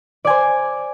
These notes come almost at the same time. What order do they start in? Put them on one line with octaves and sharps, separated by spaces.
D5 G#5 C5